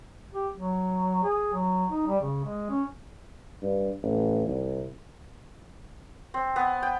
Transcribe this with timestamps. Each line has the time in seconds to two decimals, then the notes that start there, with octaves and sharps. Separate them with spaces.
0.33 G4
0.55 F#3
1.23 G#4
1.54 F#3
1.90 D#4
2.07 G3
2.21 C#3
2.44 G#3
2.70 C#4
3.62 G2
4.03 A1
4.47 C2
6.34 C4
6.56 B3
6.83 G5